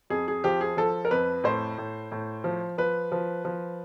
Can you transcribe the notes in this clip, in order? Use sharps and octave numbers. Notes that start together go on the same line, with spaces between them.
F2 G#4
G#4
F3 G4
G#4
F3 A4
A#4
F2 B4
A2 C5
A2
A2
F3
F3 B4
F3
F3